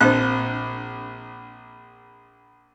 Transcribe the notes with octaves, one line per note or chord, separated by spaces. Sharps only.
A#1 C4 D4 C5 F#6